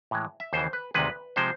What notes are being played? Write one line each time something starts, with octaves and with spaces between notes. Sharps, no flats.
A2 E3 G#3
E5
D#2 C#3 E3 C5
B4
D2 C3 D#3 G#3 B4
C3 F3 G#3 C5